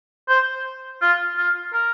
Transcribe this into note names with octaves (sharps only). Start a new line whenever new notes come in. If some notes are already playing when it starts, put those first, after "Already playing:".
C5
F4
F4
A#4